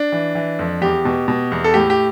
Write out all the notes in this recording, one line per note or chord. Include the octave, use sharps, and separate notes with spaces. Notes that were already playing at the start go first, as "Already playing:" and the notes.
Already playing: D4
E3
E3
F2
E2 G4
B2
B2
E2
A4
A2 G4
G4